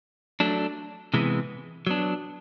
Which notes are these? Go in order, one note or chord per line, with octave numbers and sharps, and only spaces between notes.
F#3 A3 D4
C3 E3 G#3 B3
F#3 B3 D4